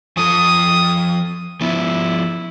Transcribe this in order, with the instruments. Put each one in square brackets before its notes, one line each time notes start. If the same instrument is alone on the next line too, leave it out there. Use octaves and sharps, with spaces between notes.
[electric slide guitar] F3 A4 [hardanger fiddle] D#6
[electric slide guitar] F3 B3 [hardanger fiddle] E4